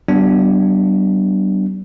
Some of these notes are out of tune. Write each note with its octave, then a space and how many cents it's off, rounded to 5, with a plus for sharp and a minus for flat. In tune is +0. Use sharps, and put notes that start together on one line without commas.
G3 -40 B3 +0 D4 +0